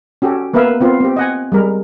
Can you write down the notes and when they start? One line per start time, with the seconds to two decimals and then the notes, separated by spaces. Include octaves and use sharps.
0.22 C#4 F#4 G4 A4
0.54 A#3 B3 A#4 B4 E5 F5
0.81 B3 C4 F4
1.00 C4 G4
1.16 D#5 F#5 G#5
1.52 G3 G#3 A#4